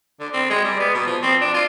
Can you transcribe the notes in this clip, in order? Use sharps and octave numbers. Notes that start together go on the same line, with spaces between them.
D3
C4
G#3
G3
B3
B2
F3
C4
D4
F4